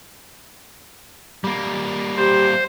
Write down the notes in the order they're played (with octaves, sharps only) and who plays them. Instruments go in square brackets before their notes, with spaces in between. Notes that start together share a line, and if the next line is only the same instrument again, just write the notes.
[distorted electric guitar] G3 A#3
[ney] G4 [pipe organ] C5